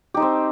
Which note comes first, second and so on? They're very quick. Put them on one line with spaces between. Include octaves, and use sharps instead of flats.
G4 D#4 C5 C4